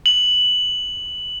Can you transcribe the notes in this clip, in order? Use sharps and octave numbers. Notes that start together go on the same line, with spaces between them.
F#7